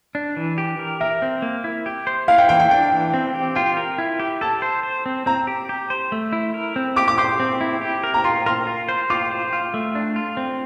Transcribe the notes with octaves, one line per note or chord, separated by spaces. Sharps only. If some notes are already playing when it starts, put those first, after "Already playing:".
D4
E3
G4
A#4
A#4 E5
C4
A#3
E4
G4
C5
E4 F5
G5
E3 G5
G5
D4 G5
E3
C4
G4
F4 G5
A#4
E4
G4
A4 A5
C5
C5
C4
C4 A#5
G4
G4
C5
A3
E4
A#4
C4
G4 D6
D6
C5 D6
C4
E4
G4
A#4
A#5
F4 C6
A#4 C6
F4
C5
F4 D6
C5
F4
A3
D4
F4
C4